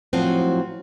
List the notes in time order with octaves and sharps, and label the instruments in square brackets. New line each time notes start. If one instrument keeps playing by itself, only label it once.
[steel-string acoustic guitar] A2 F3 F#3 C4 F#4